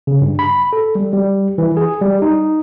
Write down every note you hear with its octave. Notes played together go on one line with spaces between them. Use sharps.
C#3
G2
B5
A4
G3
G3
E3
G#4
G3
D#4